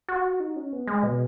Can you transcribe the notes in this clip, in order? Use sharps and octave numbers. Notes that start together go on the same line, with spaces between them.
F#4
D#4
C#4
B3
G#3
B2